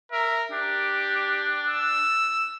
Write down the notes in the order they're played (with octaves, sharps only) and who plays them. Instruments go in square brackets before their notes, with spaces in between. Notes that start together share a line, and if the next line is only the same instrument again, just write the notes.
[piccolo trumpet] A#4 [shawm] E5
[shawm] D4 [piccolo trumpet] G4
[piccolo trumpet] E6